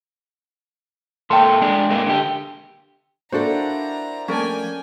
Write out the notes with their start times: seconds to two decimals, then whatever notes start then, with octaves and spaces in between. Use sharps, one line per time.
1.30 A#2 A#3 A4 G5 C6
1.62 G#3 D4 G#4
1.90 G#2 G#3 A#3
2.07 D3 G4
3.32 A#3 D4 E4 F#4 A4 C5 A#5
4.28 F3 A3 A#3 C#4 A#4 D5 G5 G#5